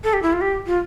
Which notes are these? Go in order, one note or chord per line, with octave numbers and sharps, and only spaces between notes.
A4
G4
E4
F4
G4
F4